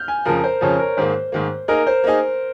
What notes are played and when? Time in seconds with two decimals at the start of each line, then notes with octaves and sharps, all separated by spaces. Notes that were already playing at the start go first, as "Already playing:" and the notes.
Already playing: F6 G6
0.08 G#5
0.25 F2 C#3 F3 A#4
0.44 C5
0.61 F2 C#3 F3 C#5
0.79 A#4
0.97 G#2 D#3 A#3 C5
1.32 G#2 D#3 A#3
1.68 A#3 D#4 G#4 A#4
1.87 C5
2.04 A#3 D#4 G#4